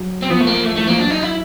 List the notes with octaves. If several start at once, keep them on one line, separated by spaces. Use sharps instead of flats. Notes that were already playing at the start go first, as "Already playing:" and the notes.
Already playing: F#3
C4
F3 B3
A3
A#3
A3
E3 A3
F3 A#3
F#3 D4
D#4
E4